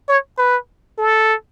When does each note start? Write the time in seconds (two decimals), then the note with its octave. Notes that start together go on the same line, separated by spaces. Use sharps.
0.08 C#5
0.38 B4
0.98 A4